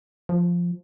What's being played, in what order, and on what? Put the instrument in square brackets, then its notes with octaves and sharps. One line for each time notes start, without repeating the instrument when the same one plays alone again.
[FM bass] F3